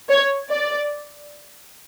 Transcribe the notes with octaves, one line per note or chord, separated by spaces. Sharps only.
C#5
D5